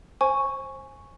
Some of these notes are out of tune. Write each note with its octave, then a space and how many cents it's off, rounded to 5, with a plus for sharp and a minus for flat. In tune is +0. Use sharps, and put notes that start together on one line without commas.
C5 +25 G#5 +0 C#6 +0